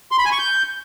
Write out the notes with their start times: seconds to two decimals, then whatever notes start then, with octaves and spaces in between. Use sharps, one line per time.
0.11 C6
0.18 B5
0.25 G#5
0.32 C#6
0.39 G6